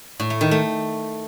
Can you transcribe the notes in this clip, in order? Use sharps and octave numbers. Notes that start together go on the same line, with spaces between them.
A2
A3
D#3
A3